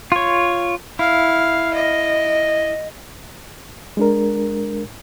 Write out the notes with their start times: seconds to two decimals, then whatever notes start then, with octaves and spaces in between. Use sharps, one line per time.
0.12 F4 C#5
0.99 E4 F5
1.74 D#5
3.97 G#3 D4 A#4